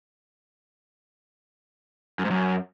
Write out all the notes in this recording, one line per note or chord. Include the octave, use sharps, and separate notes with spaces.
F#2
G#2
F#2